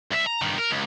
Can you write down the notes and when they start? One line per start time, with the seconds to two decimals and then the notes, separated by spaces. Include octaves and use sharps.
0.11 C2 E5
0.26 A#5
0.42 G2 D#3
0.59 A#4
0.71 C#2